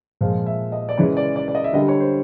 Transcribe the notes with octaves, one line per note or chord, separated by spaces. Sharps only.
A#2 F3 G#3 F5
E5
D#5
D5
C#3 E3 G#3 C#5
D5
D5
D5
D#5
E5
D3 G3 D#5
C#5
C5